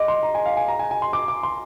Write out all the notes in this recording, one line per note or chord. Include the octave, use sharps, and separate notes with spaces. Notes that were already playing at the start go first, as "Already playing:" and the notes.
Already playing: D#3 G#3 D#4 D6
C6
A#5
G#5
F5
G#5
A#5
G#5
G#5
C6
D6
D6
C6